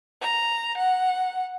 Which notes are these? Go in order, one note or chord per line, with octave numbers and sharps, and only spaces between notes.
A#5
F#5